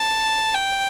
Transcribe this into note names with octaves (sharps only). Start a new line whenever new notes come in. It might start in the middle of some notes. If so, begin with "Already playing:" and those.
Already playing: A5
G5